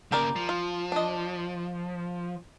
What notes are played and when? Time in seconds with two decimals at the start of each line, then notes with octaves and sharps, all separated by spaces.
0.12 C#3 A#3 G4 A#4 D5
0.36 F3
0.49 F4
0.92 D4 D#5